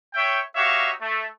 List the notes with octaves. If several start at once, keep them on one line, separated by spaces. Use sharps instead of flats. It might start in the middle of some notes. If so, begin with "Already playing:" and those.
C#5 E5 G5
D#4 F#4 G4 C#5 E5 F5
A3